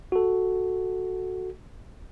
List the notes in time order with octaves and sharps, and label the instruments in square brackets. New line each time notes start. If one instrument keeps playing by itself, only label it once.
[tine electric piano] F#4 A4